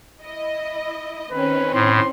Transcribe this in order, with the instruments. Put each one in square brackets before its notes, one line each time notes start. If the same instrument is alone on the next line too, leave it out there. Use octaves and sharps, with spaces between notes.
[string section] E4 D#5
[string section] D#3 C4 C#4 [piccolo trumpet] B4
[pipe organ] A2 [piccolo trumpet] C6